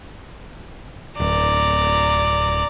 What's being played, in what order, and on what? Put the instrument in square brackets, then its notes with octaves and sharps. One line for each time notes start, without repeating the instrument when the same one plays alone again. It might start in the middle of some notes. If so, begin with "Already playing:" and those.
[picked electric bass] D1 [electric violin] D5 A#5